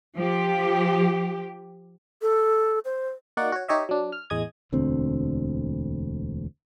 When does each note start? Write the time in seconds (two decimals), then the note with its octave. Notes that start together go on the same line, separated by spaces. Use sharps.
0.16 F3 G4
2.22 A4
2.85 C5
3.37 A#3 D#4 F#4 D5 F#5
3.52 F#4 C#5
3.68 D#4 G4 C#5 D#5 E5
3.89 F#3 D4
4.12 F6
4.30 A1 E2 G#3 D#5 D#6 G#6
4.72 E1 D2 D3 C4